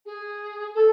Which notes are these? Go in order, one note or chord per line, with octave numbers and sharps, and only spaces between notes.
G#4
A4